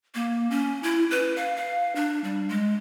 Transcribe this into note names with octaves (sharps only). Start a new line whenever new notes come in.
A#3
C#4
E4
B4
F5
F5
D4
G3
G#3